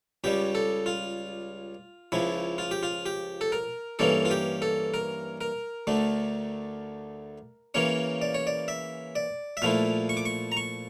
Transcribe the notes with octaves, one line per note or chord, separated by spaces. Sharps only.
C#2 C#3 G3 G4
A4
F4
C#2 C#3 F3 E4
F4
G4
F4
G4
A4
A#4
G2 E3 A#3 C#4 A4
F4
G4
A4
A#4
A#4
D2 D3 A3
C#3 E3 A#3 C#4 C#5
D5
C#5
D5
E5
D5
E5
A#2 F3 A3 E4 F5
C#6
D6
C#6
A#5
C#6